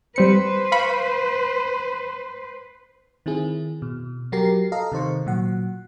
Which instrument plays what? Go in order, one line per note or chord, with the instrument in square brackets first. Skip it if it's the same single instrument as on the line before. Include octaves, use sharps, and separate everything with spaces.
[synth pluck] G3 C4 C#7 [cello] B4 C5
[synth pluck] F5 B5 C#6
[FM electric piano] D#3 C4 E4 G#4
B2
F#3 F#4 G4 A#4 A#5 C7
A4 D#5 F5 A#5
C3 D#3 C5 C#6
A#2 F#3 F#5